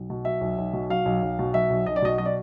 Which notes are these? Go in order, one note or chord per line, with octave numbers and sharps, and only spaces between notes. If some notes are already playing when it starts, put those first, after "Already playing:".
Already playing: B1
B2
F#3 E5
B1
B1
B2
F#3 F5
B1
B1
B2
F#3 E5
B1
B1 D#5
D5
B2 D#5
F#3 D#5
D5